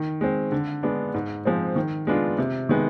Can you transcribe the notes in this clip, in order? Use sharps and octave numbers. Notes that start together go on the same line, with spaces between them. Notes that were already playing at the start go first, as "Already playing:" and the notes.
Already playing: D#3
G#3 C4
D3
G#3 B3 D4
G#2
F3 G#3 C4
D#3
G#3 B3 D4 F4
C3
D#3 G#3 B3